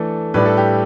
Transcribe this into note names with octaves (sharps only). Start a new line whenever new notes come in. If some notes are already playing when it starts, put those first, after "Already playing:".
Already playing: E3 A3 D4 A4
A2 G3 D4 B4
A4
G4